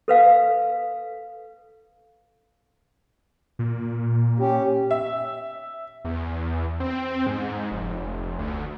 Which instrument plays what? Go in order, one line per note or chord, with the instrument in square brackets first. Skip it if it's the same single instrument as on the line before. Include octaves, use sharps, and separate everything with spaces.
[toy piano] A4 B4 F5
[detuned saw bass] A#2
[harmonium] C#4 G4
[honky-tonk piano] E5
[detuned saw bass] E2
C4
G#2
F1
D2